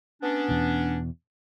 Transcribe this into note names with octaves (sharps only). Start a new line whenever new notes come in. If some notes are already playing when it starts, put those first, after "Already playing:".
B3 C#4 D4
E2 B2